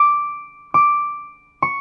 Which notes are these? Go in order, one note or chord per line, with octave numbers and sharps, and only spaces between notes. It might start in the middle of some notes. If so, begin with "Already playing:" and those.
Already playing: D6
D6
C#6